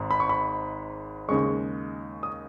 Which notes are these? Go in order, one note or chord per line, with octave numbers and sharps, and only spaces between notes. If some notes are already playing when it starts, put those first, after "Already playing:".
Already playing: G#1 G#2
B5
C#6
B5
D#2 C#3 G#3 C#6
D#6